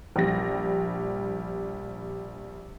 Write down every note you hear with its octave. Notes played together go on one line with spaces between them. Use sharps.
A#1 G3 A#6